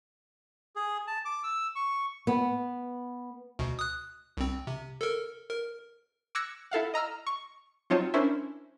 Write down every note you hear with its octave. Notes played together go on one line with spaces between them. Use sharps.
G#4
A5
D6
E6
C#6
B3
D2 B2
D#6 F#6
C2 C4
C3
A4 A#4
A#4
D6 E6 F#6 G#6 A#6 C#7
E4 A4 F5 F#5
D#5 A#5 E6 F6
C#6
F#3 C4 D#4 F4 C#5 A5
C#4 D4 E4 A#4 C5 E5